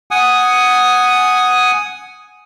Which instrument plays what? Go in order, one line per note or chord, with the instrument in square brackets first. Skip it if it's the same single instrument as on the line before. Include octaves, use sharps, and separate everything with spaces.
[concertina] F#5 G#5 D#6